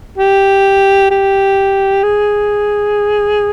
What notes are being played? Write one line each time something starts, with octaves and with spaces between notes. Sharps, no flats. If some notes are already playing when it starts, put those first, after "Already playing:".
G4
G4
G#4